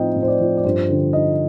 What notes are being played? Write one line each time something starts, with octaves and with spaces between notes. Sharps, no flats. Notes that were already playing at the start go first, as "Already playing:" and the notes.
Already playing: A2 F3 C4 D#4 D#5 G5
A2
C5
D5
F3
D5
G2 C5
D3
D#4 D#5